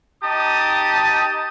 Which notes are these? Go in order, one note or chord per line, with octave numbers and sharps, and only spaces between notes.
D#4 G4 A5 D#6